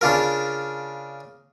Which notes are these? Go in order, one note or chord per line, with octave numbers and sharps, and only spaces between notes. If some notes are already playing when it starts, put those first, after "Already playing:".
C#3 D4 F4 A#4